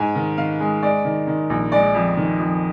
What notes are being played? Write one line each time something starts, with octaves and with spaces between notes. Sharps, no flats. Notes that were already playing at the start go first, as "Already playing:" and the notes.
Already playing: G#2 G#5
D#3
D#3 F5
G#3
G#3 D5
D#3
D#3
A#1
G#3 D5
F2
D#3
F2